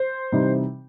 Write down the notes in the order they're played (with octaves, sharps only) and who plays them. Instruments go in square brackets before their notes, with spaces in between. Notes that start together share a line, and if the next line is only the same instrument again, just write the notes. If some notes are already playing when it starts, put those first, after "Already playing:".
Already playing: [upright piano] C5
C3 E3 G3 D#4